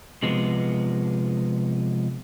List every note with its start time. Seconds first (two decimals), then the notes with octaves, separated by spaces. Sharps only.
0.23 C3 F3 G#3 B3